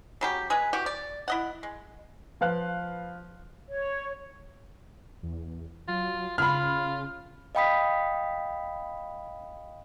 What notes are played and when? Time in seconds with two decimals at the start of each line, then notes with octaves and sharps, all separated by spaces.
0.21 C#3 F#3 G4
0.50 G#3 G#4 B4
0.73 E3 F#4 G4
0.86 D5
1.28 E4 D#5 F#5
1.63 G#3
2.41 F3 B4 F5 F#6
3.69 C#5
5.23 E2
5.88 F#3 F4
6.38 C#3 F4 B5 F6
7.55 D#5 F5 G5 B5 D#6 B6